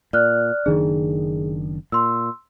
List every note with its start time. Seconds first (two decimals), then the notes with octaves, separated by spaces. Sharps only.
0.13 A#2 D5 F6 F#6
0.66 F#1 D#3 D4 G#4
1.92 A#2 C6 E6